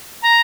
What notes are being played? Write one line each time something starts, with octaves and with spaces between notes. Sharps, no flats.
A#5